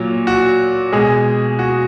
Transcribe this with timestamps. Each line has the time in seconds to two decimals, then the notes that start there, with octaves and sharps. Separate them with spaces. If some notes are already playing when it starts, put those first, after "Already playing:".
Already playing: A#2 F#3
0.27 F#4
0.92 B2 G#3 G#4
1.59 F#4